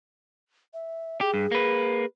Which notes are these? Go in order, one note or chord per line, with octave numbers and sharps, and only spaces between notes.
E5
G4 G#4
G2
A#3 B4